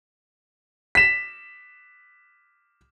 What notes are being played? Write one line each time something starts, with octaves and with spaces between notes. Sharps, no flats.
B6 E7